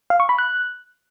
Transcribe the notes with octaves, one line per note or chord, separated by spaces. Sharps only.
F5
C#6
B5
F#6